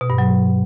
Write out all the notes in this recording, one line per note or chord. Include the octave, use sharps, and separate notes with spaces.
B2
G2
F#3